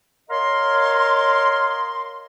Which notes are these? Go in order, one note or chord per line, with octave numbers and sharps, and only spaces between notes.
A#4 C#5 D#5 F5 A#5 C6